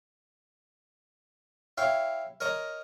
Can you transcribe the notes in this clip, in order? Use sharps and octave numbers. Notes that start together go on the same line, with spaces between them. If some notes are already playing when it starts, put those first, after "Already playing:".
E4 C#5 F5 G5
A#4 C#5 D#5 A#5